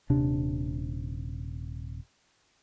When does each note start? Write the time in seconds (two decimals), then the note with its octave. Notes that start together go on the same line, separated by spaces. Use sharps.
0.10 D#1 C3 D4